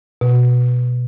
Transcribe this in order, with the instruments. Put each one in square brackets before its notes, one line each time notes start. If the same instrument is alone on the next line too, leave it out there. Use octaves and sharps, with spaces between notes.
[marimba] B2